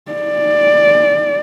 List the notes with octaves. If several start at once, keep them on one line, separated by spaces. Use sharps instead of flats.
D5